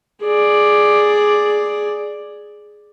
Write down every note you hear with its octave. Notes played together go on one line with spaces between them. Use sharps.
G#4 D5